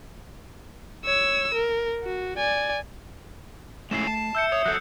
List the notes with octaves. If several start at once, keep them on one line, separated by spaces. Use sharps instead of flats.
C#5 E6
A#4
F#4
D5 G#5
G#3 A3 C#4 E4 C7 E7
A5
E5 E6 G6 C#7
C#5 D#6
F#3 A4 F#6 G6